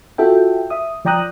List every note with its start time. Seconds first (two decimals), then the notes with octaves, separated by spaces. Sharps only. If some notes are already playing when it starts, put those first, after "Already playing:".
0.18 F4 F#4 A4 E5 G5
0.70 E5 D#6
1.05 F3 D5 G5 A#5 D#6 F#6